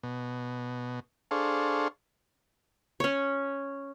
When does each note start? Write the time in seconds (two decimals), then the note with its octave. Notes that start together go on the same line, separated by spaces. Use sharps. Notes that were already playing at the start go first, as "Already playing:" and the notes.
0.03 B2
1.31 D4 G#4 A4 C5 F5 C#6
3.00 C#4 C#5